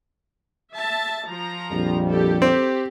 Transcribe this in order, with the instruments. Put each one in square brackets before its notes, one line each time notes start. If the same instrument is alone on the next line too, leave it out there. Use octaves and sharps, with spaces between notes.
[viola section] E5 A5
F3 A#5
[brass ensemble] A#1 F2 G3
[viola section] G4 A4
[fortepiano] C4 [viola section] G4